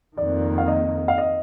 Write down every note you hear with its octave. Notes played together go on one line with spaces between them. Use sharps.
F2 D#3 A#3 D5
F5
D#5
F5
D#5